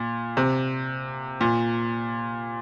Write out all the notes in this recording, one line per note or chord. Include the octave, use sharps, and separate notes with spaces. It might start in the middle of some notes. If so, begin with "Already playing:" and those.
Already playing: A#2
C3
A#2